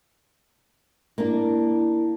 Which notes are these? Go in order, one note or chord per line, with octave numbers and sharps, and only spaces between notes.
A#3 D4 E4